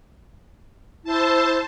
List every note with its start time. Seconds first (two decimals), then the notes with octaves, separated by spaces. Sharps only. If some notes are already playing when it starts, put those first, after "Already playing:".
1.04 E4 C5 A5